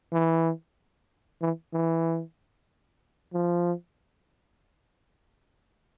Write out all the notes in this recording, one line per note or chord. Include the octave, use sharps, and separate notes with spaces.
E3
E3
E3
F3